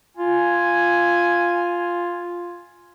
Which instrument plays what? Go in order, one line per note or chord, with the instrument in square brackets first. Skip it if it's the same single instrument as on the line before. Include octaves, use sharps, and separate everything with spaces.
[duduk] F4 [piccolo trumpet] G#5